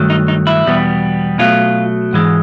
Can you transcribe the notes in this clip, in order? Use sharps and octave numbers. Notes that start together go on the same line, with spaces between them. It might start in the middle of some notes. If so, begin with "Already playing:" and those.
Already playing: G2 D#3 F#3 A3
D#4
D#4
E4
E2 B2 G3 B3
B2 F#3 A3 F4
G#2 E3 G#3